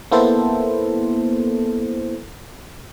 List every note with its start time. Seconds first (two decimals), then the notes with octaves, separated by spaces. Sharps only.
0.12 A#3 B3 E4 A4 C5